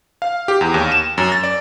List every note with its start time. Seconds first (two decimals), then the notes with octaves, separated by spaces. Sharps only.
0.22 F5
0.48 G4
0.61 E2
0.74 D#2
0.92 E7
1.18 F#2
1.32 A6
1.43 D5